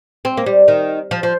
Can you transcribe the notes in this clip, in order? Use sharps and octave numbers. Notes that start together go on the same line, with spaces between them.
C4
A#3
G3
D#3
F3
F3